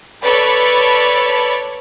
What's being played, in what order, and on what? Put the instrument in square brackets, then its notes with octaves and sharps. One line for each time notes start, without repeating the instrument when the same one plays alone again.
[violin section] A4 B4 C#5 D5 B5